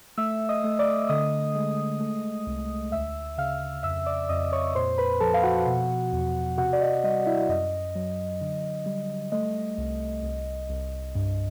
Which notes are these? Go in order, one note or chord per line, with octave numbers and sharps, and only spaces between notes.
A3 E5 E6
D#5 D#6
A3
D5 D6
D3 D#5 D#6
G#3
A3
C2
D2 E5 E6
C#3 F5 F6
F2 E5 E6
D5 D6
F2 D#5 D#6
C#5 C#6
A#2 C5 C6
B4 B5
F3 A4 A5
F5
F#4 F#5
B2
E2
C3 F#4 F#5
D5
D#5
G3 D#5
E4 E5
F#2 D#5
F#3
D3
G3
A3 D#5
C2
C2
C2
G2